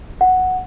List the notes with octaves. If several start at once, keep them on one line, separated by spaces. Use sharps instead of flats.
F#5